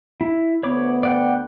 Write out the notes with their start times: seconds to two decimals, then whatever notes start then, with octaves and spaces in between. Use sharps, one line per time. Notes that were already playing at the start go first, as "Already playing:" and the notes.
0.21 E4
0.63 D2 B3 C#5 B5 D6
1.03 D5 F#5 G5